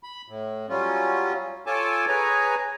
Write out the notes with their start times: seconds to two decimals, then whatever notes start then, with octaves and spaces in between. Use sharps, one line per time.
0.03 B5
0.28 A2
0.69 F#3 G3 C#4 F4
1.67 F4 A4 C#5 G#5 A5 D6
2.08 G#4 B4 C#5 G#5 A#5